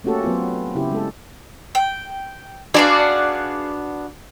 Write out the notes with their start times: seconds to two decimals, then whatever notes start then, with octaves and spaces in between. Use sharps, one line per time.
0.04 A3 A#3 C#4 F#4 G4 A4
0.24 F#3 B3 C4 F4
0.75 C#3 E4 G4
0.92 G#3 A4
1.75 G5
2.74 B3 D4 F#4 G#4 D5 F5